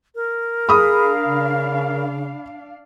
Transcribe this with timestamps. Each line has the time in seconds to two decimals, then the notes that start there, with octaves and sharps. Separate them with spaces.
0.15 A#4
0.69 D4 G#4 F5 B5 D#6
1.25 C#3